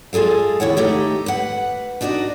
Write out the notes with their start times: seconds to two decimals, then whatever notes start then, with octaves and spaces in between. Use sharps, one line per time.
0.13 G#3 F4 G#4 A4 F5
0.60 D#2 E4 C#5 F#5
0.77 A3 D#4 G4
1.26 B4 F#5
2.01 D4 D#4 F#4 C#5 D5